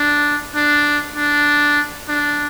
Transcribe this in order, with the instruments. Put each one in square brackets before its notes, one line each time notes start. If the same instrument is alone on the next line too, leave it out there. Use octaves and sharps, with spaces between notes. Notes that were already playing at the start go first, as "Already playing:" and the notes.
Already playing: [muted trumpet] D4
D4
D4
D4